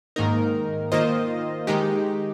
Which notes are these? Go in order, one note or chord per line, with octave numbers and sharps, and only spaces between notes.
G#2 D#3 A#3 D#4 A#4
D#3 A#3 F4 C5 D#5
D#3 G#3 D#4 G4